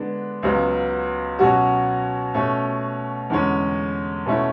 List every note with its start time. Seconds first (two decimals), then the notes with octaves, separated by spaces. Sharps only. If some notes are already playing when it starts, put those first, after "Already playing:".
Already playing: D3 G#3 B3 D4
0.43 C#2 C#3 F#3 B3
1.39 B2 F#3 C#4 F#4
2.34 B2 A3 C#4
3.30 E2 D3 G#3 C#4
4.26 B2 A3 C#4 E4